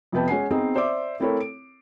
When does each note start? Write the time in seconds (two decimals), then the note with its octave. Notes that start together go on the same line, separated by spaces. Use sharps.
0.12 F2 C3 B3 B4 G5 A5
0.28 G#3 C#4 F#5 G#5 C7
0.51 B3 C4 D#4 G#4 D#5
0.76 C5 D5 E5 D6
1.20 A3 C4 E4 A4 A#4 C#5
1.40 D7